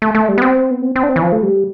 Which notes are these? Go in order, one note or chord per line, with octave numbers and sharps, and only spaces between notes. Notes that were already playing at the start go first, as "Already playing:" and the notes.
A3
A3
G3
B3
C4
B3
C4
C4
D4
C4
E3
F3
A3
G3